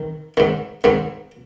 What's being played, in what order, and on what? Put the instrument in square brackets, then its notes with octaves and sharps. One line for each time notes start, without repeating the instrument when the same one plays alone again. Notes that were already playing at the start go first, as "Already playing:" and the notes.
Already playing: [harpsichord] D#3
G#2 D#3
G#2 D#3